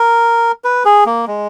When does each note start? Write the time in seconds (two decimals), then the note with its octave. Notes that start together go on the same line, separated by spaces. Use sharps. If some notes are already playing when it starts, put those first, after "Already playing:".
Already playing: A#4
0.64 B4
0.85 G#4
1.06 A#3
1.27 G#3